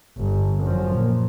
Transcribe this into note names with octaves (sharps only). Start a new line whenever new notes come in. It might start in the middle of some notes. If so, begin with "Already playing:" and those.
G1
F#2 F3
A#2